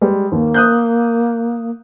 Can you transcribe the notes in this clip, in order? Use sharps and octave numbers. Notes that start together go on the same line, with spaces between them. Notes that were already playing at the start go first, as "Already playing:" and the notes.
G3 G#3
D#2 A#3
D#6 F#6 G6